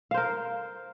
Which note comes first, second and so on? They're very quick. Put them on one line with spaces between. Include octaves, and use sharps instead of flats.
F5 C5 A#4